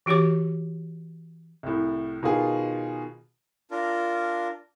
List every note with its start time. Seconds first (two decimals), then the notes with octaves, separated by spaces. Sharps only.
0.06 E3 F#4 G4 C#5 D6
1.63 C2 A2
2.23 B2 D#3 F4 G#4
3.71 D4 F4 A#4